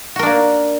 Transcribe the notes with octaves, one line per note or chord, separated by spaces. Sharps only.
A#3 D4 F#4 A#4